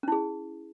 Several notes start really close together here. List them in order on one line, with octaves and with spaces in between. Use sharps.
C#4 E4 G#4